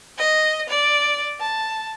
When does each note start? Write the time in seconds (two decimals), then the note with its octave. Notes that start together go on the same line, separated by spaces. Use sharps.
0.18 D#5
0.69 D5
1.40 A5